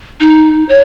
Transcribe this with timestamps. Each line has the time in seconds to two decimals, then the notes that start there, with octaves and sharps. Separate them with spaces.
0.20 D#4
0.69 C#5